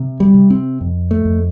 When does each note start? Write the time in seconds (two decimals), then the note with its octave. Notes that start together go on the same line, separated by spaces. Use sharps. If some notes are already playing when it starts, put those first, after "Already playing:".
Already playing: C3
0.20 G3
0.34 C3
0.50 C4
0.81 F2
1.11 A3
1.25 F2